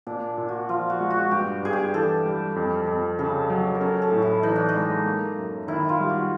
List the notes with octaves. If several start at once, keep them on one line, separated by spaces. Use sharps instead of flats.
A#2 D4
A#2
F#4
F3 F4
F#4
G#3
F#4
G2 G4
G2 G#4
G4
E3 A4
G3
F2
F2
C#3 A4
F#3
A#4
C#4 A4
A4
A2
E4
E3 D#4
D4
D#4
G#3
A#3
F#2
D#3 E4
F4
G3
F#4